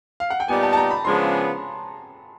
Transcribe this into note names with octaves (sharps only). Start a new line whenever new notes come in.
F5
F#5
G5
A#2 G3 B3 D#4 G4 G#5
A5
A5
A#5
B5
C#3 F3 G#3 B3 D4 C6